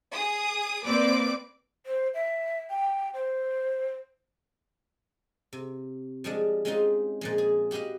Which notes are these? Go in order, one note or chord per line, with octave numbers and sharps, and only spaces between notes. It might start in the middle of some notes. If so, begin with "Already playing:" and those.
G#4 D#6
A#3 C4 B4 D5 D6
C5
E5
G5
C5
C3
F3 G3 G#3 D4
G#3 C4 C#4 D#4 F4
A#2 F3 G#3
G#4
F#4 G4 B4 D#5 F5